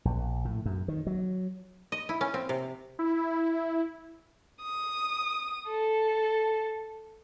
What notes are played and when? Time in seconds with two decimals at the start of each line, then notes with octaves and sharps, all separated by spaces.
0.05 A#1
0.45 A2
0.65 F#2
0.88 D#3
1.07 F#3
1.92 D#5
2.09 E4
2.21 C#4
2.34 C4
2.49 C3
2.99 E4
4.63 D#6
5.66 A4